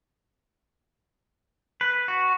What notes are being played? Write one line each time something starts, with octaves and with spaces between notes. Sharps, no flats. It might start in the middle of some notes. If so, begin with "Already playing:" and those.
B4
F#4